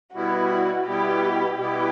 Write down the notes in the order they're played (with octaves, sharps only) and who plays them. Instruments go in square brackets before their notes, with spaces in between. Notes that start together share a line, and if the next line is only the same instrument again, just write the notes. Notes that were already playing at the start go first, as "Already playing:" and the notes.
[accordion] B2 G3 B3 E4 [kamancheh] F#4
[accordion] B2 G3 B3 E4 [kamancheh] G4
[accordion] B2 G3 B3 E4 [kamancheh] G4